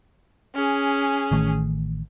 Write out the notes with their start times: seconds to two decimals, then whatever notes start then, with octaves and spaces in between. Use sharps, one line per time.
0.55 C#4 G#4
1.31 A1 D#3 A3